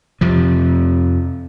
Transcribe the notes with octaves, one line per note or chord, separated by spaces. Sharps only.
F2 C3 F3